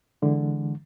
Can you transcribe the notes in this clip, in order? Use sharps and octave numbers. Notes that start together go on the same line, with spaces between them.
D3 E3 G#3